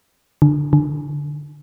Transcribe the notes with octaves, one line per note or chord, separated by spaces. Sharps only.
D3
D3